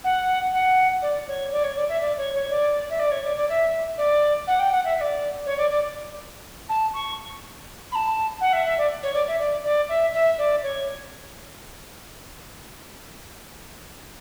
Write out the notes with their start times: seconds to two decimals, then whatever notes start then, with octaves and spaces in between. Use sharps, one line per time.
0.04 F#5
0.53 F#5
1.02 D5
1.27 C#5
1.51 D5
1.63 C#5
1.76 D5
1.88 E5
2.00 D5
2.17 C#5
2.33 C#5
2.50 D5
2.89 E5
2.99 D5
3.11 C#5
3.24 D5
3.36 D5
3.48 E5
3.97 D5
4.47 F#5
4.59 G5
4.71 F#5
4.84 E5
4.96 E5
5.00 D5
5.45 C#5
5.57 D5
5.70 D5
6.69 A5
6.93 C#6
7.91 B5
7.95 A5
8.40 F#5
8.52 E5
8.65 E5
8.77 D5
9.02 C#5
9.14 D5
9.27 E5
9.39 D5
9.63 D5
9.88 E5
10.13 E5
10.38 D5
10.62 C#5